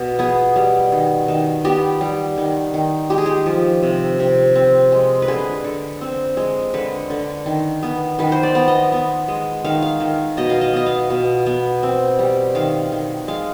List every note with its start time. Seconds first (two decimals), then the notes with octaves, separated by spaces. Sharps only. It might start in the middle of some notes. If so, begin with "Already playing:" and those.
Already playing: B2
0.19 B3 G#4
0.56 G3
0.92 D#3
1.28 D#3
1.65 B3 G4
2.01 G3
2.38 D#3
2.74 D#3
3.10 G#3 G4
3.18 G#4
3.26 G4
3.46 F3
3.83 C3
4.19 C3
4.55 C4
4.92 G#3
5.22 B4
5.28 D3 G#4
5.64 D3
6.01 C4
6.37 G#3
6.74 D3 B4
7.10 D3
7.46 D#3
7.83 B3
8.19 D#3 B4
8.32 C5
8.43 D5
8.55 B3
8.68 D#5
8.92 B3
9.28 G#3
9.65 D#3 F5
9.82 F5
10.00 D#3
10.37 B2 D#5
10.50 F5
10.61 D#5
10.73 B3 D#5
10.86 F5
11.10 B2
11.46 B3
11.83 C4
12.19 G3
12.55 D#3 F5
12.92 D#3
13.28 G#3 F5